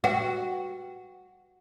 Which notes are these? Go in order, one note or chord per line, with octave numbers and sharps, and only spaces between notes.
F#4 B4 F#5 G5